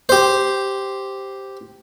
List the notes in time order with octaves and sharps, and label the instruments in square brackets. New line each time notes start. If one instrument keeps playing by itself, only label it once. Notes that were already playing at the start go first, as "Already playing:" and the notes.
[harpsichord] G4 C5